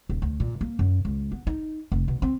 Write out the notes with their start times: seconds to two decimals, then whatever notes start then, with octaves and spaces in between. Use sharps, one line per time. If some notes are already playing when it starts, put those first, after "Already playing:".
0.09 D#1
0.22 D2
0.40 A#2
0.61 A#3
0.79 F#2
1.05 C#2
1.32 B3
1.47 D#4
1.92 F1
2.08 B2
2.22 C4